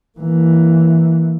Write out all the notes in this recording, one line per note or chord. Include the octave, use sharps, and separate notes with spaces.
E3 A#3